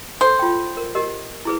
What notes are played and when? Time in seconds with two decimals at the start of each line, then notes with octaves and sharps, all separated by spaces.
0.21 A4 C5
0.39 F4 G5
0.77 A#4
0.95 G4 A#4 D#5
1.45 E4 G#4 B4